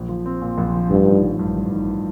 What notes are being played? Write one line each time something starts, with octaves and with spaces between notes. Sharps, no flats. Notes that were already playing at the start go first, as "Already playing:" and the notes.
Already playing: A#1
F3
C4
A#2
A#1
F3
A1 G2
D#3
A1
G2
A1
D#3